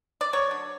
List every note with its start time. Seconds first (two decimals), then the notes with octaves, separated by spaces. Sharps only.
0.21 D5
0.33 F#3 C#5
0.51 D3